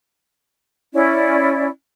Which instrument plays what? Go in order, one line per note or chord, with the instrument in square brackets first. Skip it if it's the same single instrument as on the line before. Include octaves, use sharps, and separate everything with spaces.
[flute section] C#4 E4 D5